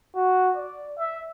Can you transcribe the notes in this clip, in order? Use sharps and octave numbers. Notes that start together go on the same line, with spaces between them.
F#4
D5
E5